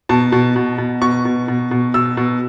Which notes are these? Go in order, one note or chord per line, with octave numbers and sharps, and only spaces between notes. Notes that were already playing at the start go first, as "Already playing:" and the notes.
B2 A5
B2
B2
B2
B2 C#6
B2
B2
B2
B2 E6
B2